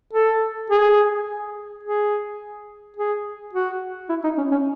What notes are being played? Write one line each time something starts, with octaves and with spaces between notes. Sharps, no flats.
A4
G#4
G#4
G#4
F#4
E4
D#4
C#4
C#4